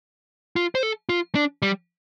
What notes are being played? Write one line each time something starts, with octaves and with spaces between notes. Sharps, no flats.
F4
C5
A4
F4
D4
G3